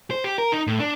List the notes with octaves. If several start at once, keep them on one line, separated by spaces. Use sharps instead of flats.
C5
G4
A#4
D#4
A2
D4